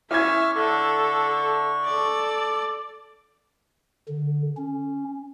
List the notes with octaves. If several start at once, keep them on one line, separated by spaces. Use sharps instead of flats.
C#4 E4 E5 C#6 D6 F6 G#6
D3 A4 C#6
A4 D5
D3
C#4